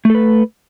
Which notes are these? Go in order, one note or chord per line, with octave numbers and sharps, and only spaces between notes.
A3 A4 B4